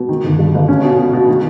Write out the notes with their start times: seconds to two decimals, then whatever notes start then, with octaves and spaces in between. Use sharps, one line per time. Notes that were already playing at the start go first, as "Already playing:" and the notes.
Already playing: B2
0.09 D#3
0.24 G1
0.39 G2
0.54 G1
0.68 C#4
0.84 B2
0.99 B2
1.13 B2
1.28 D#3